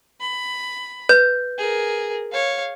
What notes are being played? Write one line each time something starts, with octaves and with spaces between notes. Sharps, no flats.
B5
B4 G6
G#4 A#4
C#5 F5